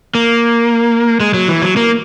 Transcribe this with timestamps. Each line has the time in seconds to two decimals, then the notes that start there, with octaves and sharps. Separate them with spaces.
0.15 A#3
1.20 G#3
1.34 F#3
1.49 E3
1.62 F#3
1.76 A#3